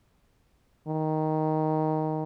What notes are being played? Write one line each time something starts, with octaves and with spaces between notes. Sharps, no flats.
D#3